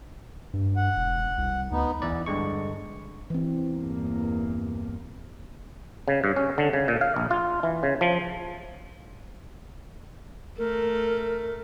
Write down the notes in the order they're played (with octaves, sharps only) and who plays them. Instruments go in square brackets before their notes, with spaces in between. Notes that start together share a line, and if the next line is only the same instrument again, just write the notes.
[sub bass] G2
[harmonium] F#5
[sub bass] E1
C2
[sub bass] D2 [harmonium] B3 D#4
[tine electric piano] E2 E3 B3 D5
G2 D3 G#3 C#6
[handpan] E3 C4
[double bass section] E2 G2 A#3
[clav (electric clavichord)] C#3
G2
C#4
D3
C#3
A#2
F5
A#1
F4
E3
C#3
F3
[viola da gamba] A3 [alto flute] A#4